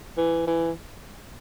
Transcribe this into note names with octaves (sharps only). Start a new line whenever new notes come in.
E3
E3